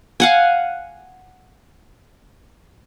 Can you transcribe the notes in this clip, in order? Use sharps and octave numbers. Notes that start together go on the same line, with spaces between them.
F5 F#5 G#5